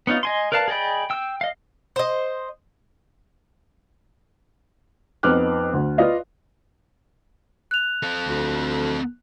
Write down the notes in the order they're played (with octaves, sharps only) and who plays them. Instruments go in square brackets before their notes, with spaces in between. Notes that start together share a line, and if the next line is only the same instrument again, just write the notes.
[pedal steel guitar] B3 C#4 D#4 F4
D#5 G#5 C6
A#4 B4 D5 F5 A5
G#4 D5 D#5 G5 B5
G5 E6
D#5 F5
[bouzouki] C5 D#5
[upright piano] F2 B3 D#4 D6 F6 F#6
D2
F4 B4 D5 D#5 F5
[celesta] F#6 F7
[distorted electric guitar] C4 A4
[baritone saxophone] D2